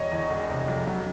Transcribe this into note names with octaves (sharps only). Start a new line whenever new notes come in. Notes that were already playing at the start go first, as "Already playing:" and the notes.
Already playing: E1 C#5 D#5
E2
E1
C3
F2
F#3